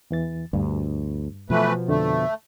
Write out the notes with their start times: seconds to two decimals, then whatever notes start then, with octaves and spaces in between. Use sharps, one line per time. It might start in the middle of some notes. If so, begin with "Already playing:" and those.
0.11 E2 E3 A6
0.53 D2 G2
1.50 B2 E3 F3 A3 B3 B4
1.88 F2 D3 A3